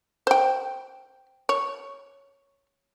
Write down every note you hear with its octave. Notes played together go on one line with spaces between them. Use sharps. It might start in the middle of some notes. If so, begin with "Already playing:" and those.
C5 G5
C#5